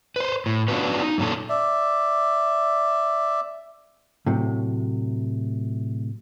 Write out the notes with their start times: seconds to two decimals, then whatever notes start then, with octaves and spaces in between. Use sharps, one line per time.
0.16 B4 C5
0.46 A2
0.68 B3 C#4 D4 F4 F#4 B4
1.02 D#4
1.18 F#2 A#2 C#4 A4
1.49 D5 E5
4.26 A2 C3 F#3